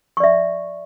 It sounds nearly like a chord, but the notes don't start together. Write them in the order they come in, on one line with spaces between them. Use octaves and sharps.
C#6 D5 E5